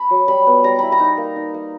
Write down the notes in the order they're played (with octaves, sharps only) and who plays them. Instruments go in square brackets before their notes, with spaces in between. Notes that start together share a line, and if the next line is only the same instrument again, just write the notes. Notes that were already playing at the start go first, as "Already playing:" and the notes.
Already playing: [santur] A5 B5
F#3
G3 B5
B3
G3 A#5
E4 B5
A#5
D#4
A#3
D#4
A#3